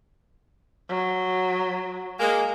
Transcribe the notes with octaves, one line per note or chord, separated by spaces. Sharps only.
F#3
G#3 A#3